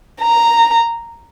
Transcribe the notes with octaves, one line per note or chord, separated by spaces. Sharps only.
A#5